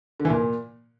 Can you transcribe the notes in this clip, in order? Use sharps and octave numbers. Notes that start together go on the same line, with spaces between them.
D3
E3
A#2